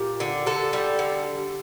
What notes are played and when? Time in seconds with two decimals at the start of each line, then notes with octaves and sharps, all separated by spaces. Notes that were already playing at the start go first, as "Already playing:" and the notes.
Already playing: A#2 G4
0.20 D3
0.46 D3 A4
0.73 G3
0.99 D3